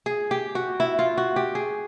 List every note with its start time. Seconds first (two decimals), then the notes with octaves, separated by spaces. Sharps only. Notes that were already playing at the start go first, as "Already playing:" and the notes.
0.06 G#4
0.31 G4
0.55 F#4
0.80 E4
0.99 F4
1.18 F#4
1.36 G4
1.55 G#4